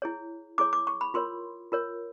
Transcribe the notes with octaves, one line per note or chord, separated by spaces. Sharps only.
E4 G#4 C#5
E4 G#4 C#5 D6
D6
C#6
B5
F4 A#4 C#5 C6
F4 A#4 C#5